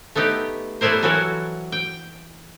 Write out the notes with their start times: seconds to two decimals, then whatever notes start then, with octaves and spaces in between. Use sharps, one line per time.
0.16 A3 B3 D#4 G4
0.81 G3 A3 B3 E4 A#4 C5
1.03 E3 F#3 F#4 A4 A#4
1.72 G5